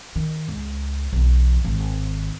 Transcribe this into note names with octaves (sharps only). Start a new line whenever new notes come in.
D#3
C#2
B1 E3
G#1 D#3